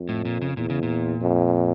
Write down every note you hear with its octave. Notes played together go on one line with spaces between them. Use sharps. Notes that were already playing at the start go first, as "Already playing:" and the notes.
Already playing: F2
A2
A#2
C#3
E2 A#2
C#3
A#2
F2